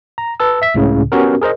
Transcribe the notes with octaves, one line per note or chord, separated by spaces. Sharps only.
A#5
B4 A5 E6
E5 B6
C#2 A2 C#3
B3 C#4 F#4 G4 A#4
G#4 A#4 C5 D#5